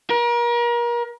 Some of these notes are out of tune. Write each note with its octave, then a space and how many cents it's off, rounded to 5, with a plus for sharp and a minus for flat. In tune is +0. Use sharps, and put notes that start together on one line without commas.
A#4 +35